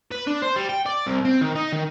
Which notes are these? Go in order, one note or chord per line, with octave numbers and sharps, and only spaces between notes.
B4
D4
C5
G3
G5
D5
C2
C4
D#3
D#4
D#3